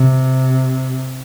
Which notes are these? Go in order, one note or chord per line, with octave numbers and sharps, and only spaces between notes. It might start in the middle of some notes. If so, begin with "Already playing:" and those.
Already playing: C3